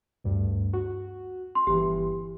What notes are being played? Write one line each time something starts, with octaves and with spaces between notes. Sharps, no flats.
D2 G2
F#4
C6
G1 E3 G4